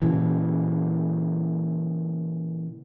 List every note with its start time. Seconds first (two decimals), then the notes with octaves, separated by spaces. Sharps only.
0.02 A#2 C#3 E3